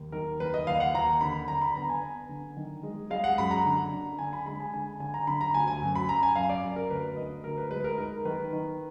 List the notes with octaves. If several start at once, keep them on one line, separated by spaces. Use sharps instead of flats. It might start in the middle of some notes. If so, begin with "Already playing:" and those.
Already playing: D#2
D#3 A#4
D#2 B4
D#5
D#2 F5
F#5
D#2 A#5
D3 B5
D3 A#5
B5
B3 A#5
G#5
B3
D3
D#3
G#3
G#3 F5
F#5
F#2 B5
A#5
D3
D3
D3 G#5
B5
G#3 B5
G#5
D3 G#5
D3 G#5
A#5
D3 B5
A#5
D2 G#5
G#5
F#2
B5
F#2 A#5
G#5
F#2 F5
D5
F#2
A#4
D2 B4
D3 D#5
D2 A#4
B4
G#3 B4
A#4
D#4 A#4
D#3 B4
D#3